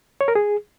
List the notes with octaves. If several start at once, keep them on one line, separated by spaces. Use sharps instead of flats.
C#5
A#4
G#4